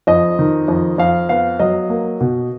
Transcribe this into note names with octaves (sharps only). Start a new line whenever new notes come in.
F2 D#5
D#3
F2
F2 F5
B3 F5
F#3 D#5
A#3
B2